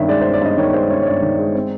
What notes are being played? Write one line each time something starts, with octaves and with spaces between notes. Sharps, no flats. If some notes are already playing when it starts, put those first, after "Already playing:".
Already playing: G2 D#3 C#4 E5
G#3 D5
C5
C#4
D5
G2 D#5
D#3 C#5
G#3 C5
C#4 C#5
C#5
G2 D5
D#3
G#3
C4